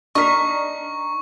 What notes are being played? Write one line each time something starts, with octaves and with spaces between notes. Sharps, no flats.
D4 D#4 A#4 C#6 B6